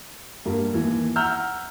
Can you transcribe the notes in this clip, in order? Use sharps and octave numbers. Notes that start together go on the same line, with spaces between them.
G2 G3 A#3
D#2 E3
E5 F#5 A#5 E6 F6 G6